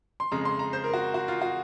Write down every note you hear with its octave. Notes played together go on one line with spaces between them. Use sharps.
C6
F2 C#3 G#3 A#5
C6
A#5
C5
A#4
F#4
F#4
F4
F#4